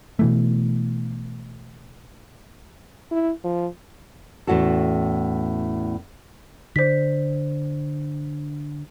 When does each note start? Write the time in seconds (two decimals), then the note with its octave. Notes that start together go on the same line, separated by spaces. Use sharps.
0.19 B2 E3 A3
3.11 E4
3.44 F3
4.47 E2 A2 C#4 F#4 A4
6.76 D3 C5 B6